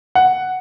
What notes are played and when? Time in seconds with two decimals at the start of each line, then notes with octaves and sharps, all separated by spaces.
0.15 F#5